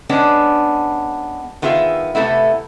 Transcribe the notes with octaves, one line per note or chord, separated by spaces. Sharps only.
G#3 B3 C#4 D4
D#3 B3 F4 G#4 E5
C3 A3 B3 E4